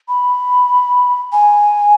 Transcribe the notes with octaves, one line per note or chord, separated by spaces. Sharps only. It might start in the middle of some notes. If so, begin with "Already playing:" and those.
B5
G#5